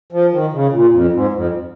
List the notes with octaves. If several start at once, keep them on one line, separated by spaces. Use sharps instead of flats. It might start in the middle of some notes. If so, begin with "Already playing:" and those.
F3
D#3
C#3
A#2
F2
G#2
F2